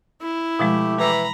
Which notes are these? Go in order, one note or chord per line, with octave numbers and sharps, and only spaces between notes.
E4
B2 F3 G#3 A3 G4
E3 A#5 B5